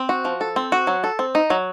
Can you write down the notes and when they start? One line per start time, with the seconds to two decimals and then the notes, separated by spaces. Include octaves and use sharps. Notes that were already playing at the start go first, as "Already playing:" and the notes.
Already playing: C4
0.09 F#4
0.25 F3
0.41 A4
0.56 C4
0.72 F#4
0.87 F#3
1.04 A4
1.19 C4
1.35 D#4
1.50 F#3